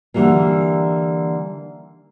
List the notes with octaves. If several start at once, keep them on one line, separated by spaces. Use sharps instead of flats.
D3 E3 G3 A#3